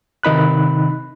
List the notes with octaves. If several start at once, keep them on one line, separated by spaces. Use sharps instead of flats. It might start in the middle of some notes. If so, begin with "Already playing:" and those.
C3 D#3 D#4 B5 F#6